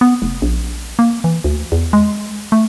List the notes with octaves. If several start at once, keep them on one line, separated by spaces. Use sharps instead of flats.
B3
F1
A#1
A#3
E3
D2
E2
G#3
A3